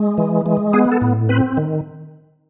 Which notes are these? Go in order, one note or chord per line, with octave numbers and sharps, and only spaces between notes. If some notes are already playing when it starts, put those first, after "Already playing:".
Already playing: G#3
E3
G#3
B3 G#4
A4
A2
C4 B4
D#3